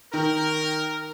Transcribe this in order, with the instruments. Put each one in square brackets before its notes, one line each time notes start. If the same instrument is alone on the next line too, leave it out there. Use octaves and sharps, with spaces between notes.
[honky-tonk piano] D#3 [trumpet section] A#4